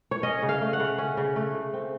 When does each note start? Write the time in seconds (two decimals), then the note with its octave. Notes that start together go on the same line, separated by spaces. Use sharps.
0.11 C#5
0.23 C#4 D#5
0.42 C#3
0.49 F5
0.61 A3
0.73 F#5
0.80 C#3
0.98 C#4
1.17 C#3
1.36 A3
1.55 C#3
1.73 C4